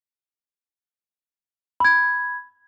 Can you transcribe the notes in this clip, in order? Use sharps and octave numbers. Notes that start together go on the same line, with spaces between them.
B5 G#6